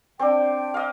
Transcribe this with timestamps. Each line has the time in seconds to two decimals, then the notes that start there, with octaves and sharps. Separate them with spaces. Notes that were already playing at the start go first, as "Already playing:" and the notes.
0.19 C4 D4 G5
0.74 D#5 F5